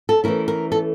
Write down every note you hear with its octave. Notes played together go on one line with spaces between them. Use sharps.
A4
E3 A3 C#4 E4 A#4
A#4
A4